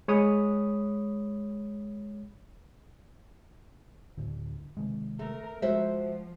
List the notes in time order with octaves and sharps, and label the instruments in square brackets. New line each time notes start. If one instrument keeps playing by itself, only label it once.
[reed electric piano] G#3 C#5 B5 D#6
[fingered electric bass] D2 A2 D3
C3 D#3 G#3
[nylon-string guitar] A3 [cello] A#4
[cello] F3 [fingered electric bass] G#3 [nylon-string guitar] F#4 C5 E5